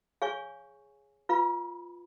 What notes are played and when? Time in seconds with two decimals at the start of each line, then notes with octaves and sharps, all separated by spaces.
0.22 G#4 C#5 F5 G#5 C#6
1.29 F4 B4 F5 B5